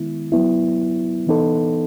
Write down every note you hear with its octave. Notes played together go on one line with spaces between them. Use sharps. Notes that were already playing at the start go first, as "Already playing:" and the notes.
Already playing: D#3 G#3 B3 E4
F#3 B3 E4
E3 B3 D#4 A4